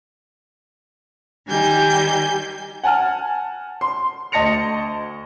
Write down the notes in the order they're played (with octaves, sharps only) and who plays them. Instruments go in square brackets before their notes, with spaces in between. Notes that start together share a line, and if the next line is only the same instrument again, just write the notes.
[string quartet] D#3 G3 G#5 G6
[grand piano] F#5 G#5 A5 F6
C6
D2 D#5 A5 A#6 C#7 F7